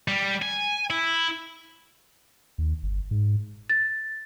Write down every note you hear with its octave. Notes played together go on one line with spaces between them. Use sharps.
G3
G#5
E4
D#2
G1
G#2
A6